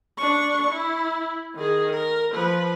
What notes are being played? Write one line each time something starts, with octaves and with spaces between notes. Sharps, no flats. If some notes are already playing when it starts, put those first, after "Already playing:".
D4 C#6
E4
D#3 G#4
A#4
F3 B4